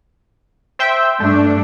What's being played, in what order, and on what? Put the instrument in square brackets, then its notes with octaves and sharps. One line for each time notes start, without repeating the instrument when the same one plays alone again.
[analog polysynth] C5 E5 G5
[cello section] G2 D4 [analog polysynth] A3